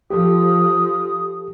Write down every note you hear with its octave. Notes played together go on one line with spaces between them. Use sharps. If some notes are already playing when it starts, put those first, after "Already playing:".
F3 G4 A4 D#6